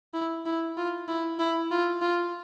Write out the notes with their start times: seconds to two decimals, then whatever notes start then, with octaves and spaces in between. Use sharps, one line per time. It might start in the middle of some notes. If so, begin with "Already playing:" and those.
0.14 E4
0.46 E4
0.77 F4
1.08 E4
1.39 E4
1.71 F4
2.02 F4